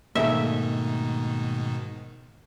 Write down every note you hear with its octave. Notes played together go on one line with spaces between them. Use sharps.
G#2 B2 D#3 A3 A#3 G#4 E5